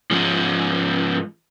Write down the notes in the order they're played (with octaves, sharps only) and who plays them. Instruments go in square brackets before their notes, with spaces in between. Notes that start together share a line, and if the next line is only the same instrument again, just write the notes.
[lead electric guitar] G#2 F3